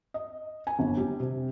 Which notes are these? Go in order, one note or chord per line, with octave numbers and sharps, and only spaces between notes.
D#5
G#5
G1
G3
C3